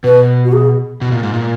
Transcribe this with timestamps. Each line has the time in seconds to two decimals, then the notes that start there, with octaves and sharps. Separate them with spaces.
0.04 B2 B4
0.45 F#4
0.53 G#4
1.01 B2
1.12 A#2
1.23 G#2
1.34 A#2